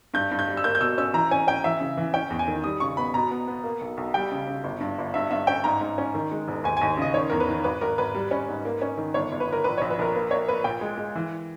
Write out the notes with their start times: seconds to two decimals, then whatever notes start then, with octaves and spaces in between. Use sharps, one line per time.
0.14 G2 G6
0.31 G2
0.39 G6
0.47 G3
0.57 E6
0.64 A#3 G6
0.75 G6
0.80 B2 E6
0.98 C#4 E6
1.14 E3 A#5
1.31 C#4 G#5
1.47 C#4 G5
1.64 E3 E5
1.80 C#3
1.97 E3
2.14 C#4 G5
2.30 E2
2.39 G#5
2.48 D#3
2.64 G3 D#6
2.80 C#3 C#6
2.97 B3 B5
3.14 B2 A#5
3.31 B3
3.47 B3
3.64 A#3
3.81 B1
3.97 B1
4.14 G3 G5
4.32 C#3
4.48 C#3
4.64 G1
4.81 G2
4.98 G1
5.14 G2 E5
5.31 G2 E5
5.47 C#4 G5
5.64 G#2 A#5
5.81 G#2
5.98 C#4
6.15 D#3
6.31 G#3
6.48 E1
6.64 D#2 G#5
6.77 D#2 G#5
6.97 C#3 D#5
7.14 D#3 C#5
7.30 E2 A#4
7.40 B4
7.48 D#3
7.64 G#1 B4
7.81 G#1 A#4
7.98 G#1 B4
8.14 G3
8.31 C#4
8.48 G#2
8.65 A#3
8.82 C#4
8.97 D#3
9.14 G1 C#5
9.32 G1
9.40 B4
9.47 G1
9.52 A#4
9.64 A#1 B4
9.78 A#1 C#5
9.90 B4
9.99 A#1 A#4
10.15 A#3 B4
10.31 A#3 C#5
10.48 A#3 B4
10.64 A#2 G5
10.81 G#3
10.98 G#3
11.15 E3